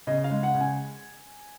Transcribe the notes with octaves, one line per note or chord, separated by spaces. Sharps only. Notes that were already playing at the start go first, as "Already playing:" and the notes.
C#3 D#5
F5
G#3
F#5
C#3
G#5